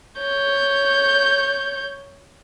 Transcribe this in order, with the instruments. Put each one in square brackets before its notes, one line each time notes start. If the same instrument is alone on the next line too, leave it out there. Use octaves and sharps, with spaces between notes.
[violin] C#5 G6